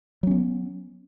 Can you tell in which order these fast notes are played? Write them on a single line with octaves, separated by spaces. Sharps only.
F#3 C#4 B3